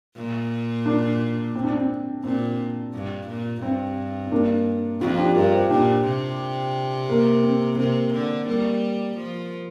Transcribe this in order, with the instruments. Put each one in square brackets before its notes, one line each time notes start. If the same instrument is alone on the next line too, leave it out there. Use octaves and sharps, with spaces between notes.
[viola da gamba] A#2
[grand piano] A#3 D4
C4
D4
C4
[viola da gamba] A#2 [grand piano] C4
[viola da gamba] G2
A#2
[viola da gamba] G2 [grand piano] C4
[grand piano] C4
A#3 D4
[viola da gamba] F2 [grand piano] C4 F4
[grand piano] D4 G4
[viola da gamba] G2 [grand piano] F4 A#4
[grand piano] G4 C5
[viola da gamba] A#2 [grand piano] D4 G4
[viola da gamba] C3
[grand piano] A#3
C4
C4
[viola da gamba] C3 [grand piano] A#3
[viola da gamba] D3
[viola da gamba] G3 [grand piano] A#3
[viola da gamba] F3